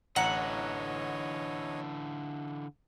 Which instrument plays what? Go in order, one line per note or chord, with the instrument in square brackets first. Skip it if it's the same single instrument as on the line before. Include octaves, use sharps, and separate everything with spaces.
[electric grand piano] A1 A#5 C#7 [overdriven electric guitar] D3 E3 [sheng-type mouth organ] C#5 D#5 [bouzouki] F#5